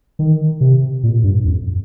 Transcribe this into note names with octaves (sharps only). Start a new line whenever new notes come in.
D#3
C3
A#2
G2
F2